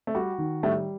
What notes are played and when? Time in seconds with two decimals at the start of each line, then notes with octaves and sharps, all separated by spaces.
0.07 A3
0.15 G3 F#4
0.38 D#3
0.63 A2 G3 A3